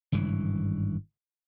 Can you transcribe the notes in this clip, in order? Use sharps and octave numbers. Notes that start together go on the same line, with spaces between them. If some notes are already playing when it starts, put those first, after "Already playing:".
G#1 G2 C#3 E3